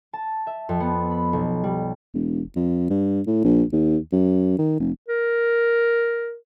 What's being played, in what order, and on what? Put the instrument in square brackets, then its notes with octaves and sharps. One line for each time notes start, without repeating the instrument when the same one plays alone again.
[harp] A5
E5
F2
B3
B5
B1
G3
[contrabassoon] E1
F2
G2
A2
A#1
D#2
F#2
D#3
F1
[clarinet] A#4